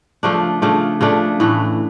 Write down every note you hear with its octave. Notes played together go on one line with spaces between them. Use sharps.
C#3 F3 A3 D4
C#3 F3 A3 D4
C#3 F3 A3 D4
A2 E3 A3